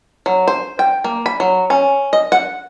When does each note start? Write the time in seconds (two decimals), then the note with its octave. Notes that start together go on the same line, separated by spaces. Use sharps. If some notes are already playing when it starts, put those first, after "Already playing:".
0.26 F#3
0.48 C5
0.79 G5
1.04 A#3
1.26 B5
1.40 F#3
1.70 C#4
2.13 D#5
2.32 F#5